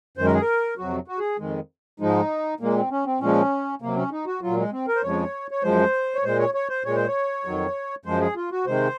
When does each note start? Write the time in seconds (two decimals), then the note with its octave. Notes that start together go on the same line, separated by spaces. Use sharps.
0.17 F#2 D#3 G#3 C5
0.26 A#4
0.33 G#4
0.41 A#4
0.78 F2 C3 F#3 F#4
1.08 F#4
1.19 G#4
1.38 F2 D#3 G#3
2.00 G#2 F3 G#3 D#4
2.60 A#2 G#3 A#3
2.76 C4
2.91 C#4
3.06 C4
3.20 A#2 F3 G#3 C#4
3.82 C3 F#3 A#3
3.96 C#4
4.11 D#4
4.26 F#4
4.42 F#3 F4
4.47 A#2
4.57 G#3
4.72 C4
4.88 A#4
4.96 C5
5.03 F2 C#3 F3 G#3 C#5
5.51 C#5
5.63 F#2 F3 G#3 C5
6.15 C#5
6.24 A#2 G#3 C5
6.39 C#5
6.54 C#5
6.69 C5
6.85 A#2 G#3 C#5
6.96 C5
7.07 C#5
7.45 F2 D#3 F#3
8.05 F#2 F3 G#3 C5
8.21 G#4
8.36 F4
8.52 F#4
8.67 C3 D#3 G#3 C5